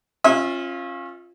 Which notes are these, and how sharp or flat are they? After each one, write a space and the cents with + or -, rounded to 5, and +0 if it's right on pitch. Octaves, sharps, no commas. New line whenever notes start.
C#4 -30 F4 +0 E5 -35